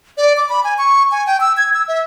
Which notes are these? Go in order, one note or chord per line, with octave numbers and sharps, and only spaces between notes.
D5
D6
B5
G#5
C#6
G#5
G5
E6
G#6
E6
E5